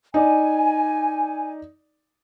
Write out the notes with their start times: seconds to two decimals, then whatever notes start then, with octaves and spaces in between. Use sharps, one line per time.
0.14 D#4 D5 G#5